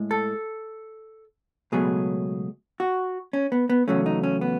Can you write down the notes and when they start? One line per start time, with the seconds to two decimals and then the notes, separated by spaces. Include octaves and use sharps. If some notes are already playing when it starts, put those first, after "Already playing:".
Already playing: A2 G#3
0.11 A4
1.72 C#2 B2 F#3 A3 G#4
2.80 F#4
3.33 C#4
3.52 B3
3.70 B3
3.88 E2 C#3 F#3 A3 C#4
4.06 D#4
4.23 C#4
4.41 B3